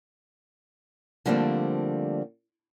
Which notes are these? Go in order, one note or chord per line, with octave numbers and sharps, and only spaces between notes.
D3 F3 G3 A3 A#3 C4